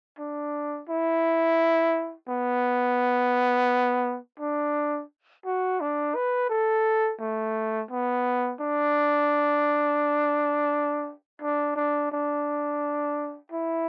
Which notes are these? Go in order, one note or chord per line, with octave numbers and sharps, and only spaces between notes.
D4
E4
B3
D4
F#4
D4
B4
A4
A3
B3
D4
D4
D4
D4
E4